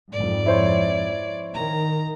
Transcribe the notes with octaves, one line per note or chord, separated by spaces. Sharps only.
F2 G#2 D5
E4 C5 C#5
D#3 A#5